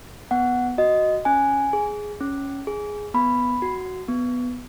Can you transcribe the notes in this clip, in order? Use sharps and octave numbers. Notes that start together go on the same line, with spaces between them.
B3 F#5
F#4 D#5
C#4 G#5
G#4
C#4
G#4
B3 B5
F#4
B3